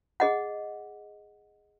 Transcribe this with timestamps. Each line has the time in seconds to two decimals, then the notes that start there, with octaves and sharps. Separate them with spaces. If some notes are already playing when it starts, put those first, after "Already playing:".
0.20 G#4 D#5 F#5